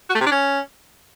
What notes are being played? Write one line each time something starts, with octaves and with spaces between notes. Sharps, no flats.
F#4
A3
C3
D4
C#4